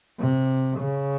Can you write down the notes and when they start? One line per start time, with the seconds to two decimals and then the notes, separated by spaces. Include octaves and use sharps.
0.19 C3
0.79 C#3